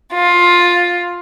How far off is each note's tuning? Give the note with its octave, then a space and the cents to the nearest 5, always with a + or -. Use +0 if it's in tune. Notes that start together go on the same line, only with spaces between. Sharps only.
F4 +10